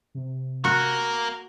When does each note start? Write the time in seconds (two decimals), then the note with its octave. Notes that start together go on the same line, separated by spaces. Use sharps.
0.15 C3
0.65 A#3 F#4 A#4